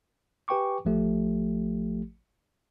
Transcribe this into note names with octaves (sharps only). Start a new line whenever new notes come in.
G4 B4 G5 G#5 C#6 D6
A1 F3 A3 G4